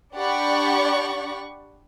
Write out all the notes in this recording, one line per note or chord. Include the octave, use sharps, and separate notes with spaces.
D4 G4 D5 F#5 B5 C#6